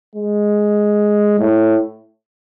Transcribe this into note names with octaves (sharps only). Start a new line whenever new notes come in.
G#3
A2